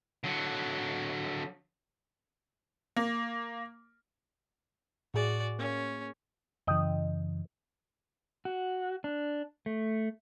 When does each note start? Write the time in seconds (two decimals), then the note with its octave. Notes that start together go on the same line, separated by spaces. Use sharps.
0.24 D3 F#3
2.96 A#3
5.14 A2 F#4 G#4 D5
5.59 A#3 C#4
6.67 F#2 C#3 E3 D#5 G5
8.45 F#4
9.04 D4
9.66 A3